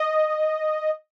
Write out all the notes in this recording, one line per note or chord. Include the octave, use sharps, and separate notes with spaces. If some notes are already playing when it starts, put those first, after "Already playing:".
Already playing: D#5